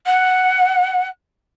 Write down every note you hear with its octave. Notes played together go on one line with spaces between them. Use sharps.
F#5